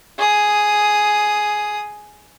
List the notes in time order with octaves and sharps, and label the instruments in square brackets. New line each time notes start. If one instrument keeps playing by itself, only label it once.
[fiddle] G#4 D#6